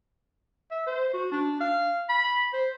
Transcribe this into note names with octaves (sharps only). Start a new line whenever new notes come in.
E5
C5
F#4
D4
F5
B5
C5